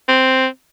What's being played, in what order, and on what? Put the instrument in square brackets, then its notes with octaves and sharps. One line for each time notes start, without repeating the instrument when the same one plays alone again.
[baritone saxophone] C4